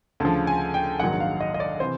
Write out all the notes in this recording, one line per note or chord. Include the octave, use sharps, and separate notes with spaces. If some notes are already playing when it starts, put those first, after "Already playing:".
D2 C#3 F3 A5
G#5
G5
A#1 G#2 D#3 F#3 F#5
F5
D#5
D#5
D5
C3 E3 C5